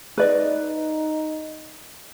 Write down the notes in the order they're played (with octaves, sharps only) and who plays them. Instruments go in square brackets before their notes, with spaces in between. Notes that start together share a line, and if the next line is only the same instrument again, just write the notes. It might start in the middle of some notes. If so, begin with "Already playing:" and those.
[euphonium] D#4 [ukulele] B4 D5 D#5